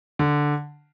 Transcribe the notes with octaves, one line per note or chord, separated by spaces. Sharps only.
D3